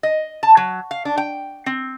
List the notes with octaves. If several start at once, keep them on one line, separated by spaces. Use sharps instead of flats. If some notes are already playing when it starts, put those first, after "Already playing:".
D#5
A5
F#3
F5
D4
G5
C4